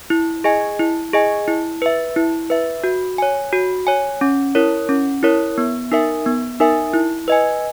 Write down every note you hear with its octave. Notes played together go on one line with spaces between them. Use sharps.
E4
G#4 D#5 G#5
E4
G#4 D#5 G#5
E4
B4 E5
E4
B4 E5
F#4
C#5 G#5
F#4
C#5 G#5
C#4
E4 A#4 C#5
C#4
E4 A#4 C#5
B3
D#4 A#4 E5 G#5
B3
D#4 A#4 E5 G#5
E4
B4 D#5 G#5